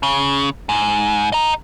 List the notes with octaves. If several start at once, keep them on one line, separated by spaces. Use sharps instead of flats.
C#3
G#2
D#5 A#5